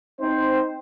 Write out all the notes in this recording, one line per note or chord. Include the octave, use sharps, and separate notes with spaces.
C4 D#4 C5